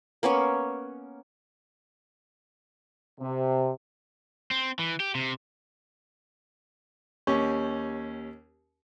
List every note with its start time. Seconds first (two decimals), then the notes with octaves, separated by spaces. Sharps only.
0.23 A#3 B3 C#4 C#5
3.20 C3
4.51 C4
4.79 E3
5.00 G4
5.15 C3
7.27 D#2 C#4 G4 C#6